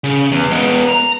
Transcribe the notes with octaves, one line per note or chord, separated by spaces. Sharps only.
C#3
E2
G#3 B3
A#5